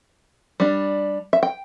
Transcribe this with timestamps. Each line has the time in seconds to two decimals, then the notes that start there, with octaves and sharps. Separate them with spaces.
0.60 G3 D4
1.33 E5
1.43 G5